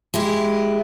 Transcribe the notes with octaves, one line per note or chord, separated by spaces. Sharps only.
G#3 E4 G4